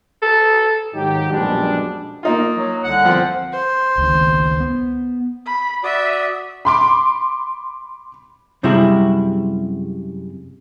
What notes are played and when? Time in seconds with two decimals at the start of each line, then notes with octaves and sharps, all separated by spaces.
0.22 A4
0.94 G#2 D#3 F#3 D#4 G4
1.32 A#1 F#2 B2 G3 G#3 D4
2.23 A#3 D#4 F4
2.56 F#3
2.84 C2 D3 F#5
3.05 F3 C4
3.52 C5
3.98 C#2 D#3
4.60 B3
5.46 B5
5.84 F#4 D5 E5 D#6
6.65 B5 C6 D6
8.63 F#2 C3 G3 G#3 E4 F#4